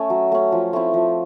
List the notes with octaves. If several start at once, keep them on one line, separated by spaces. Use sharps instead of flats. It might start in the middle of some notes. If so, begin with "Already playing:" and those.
Already playing: A3 C#4 A4
F#3
A3 C#4
F3
A3 C4 E4
F3